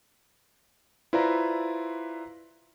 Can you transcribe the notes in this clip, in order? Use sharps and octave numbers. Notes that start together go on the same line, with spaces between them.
E4 F4 B4 C5 D5 A#5